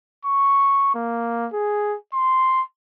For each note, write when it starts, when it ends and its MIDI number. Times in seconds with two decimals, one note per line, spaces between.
0.25 0.93 85
0.95 1.47 58
1.53 1.95 68
2.14 2.62 84